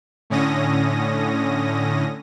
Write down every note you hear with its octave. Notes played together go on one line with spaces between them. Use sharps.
A2 D3 C#4 D#6 A#6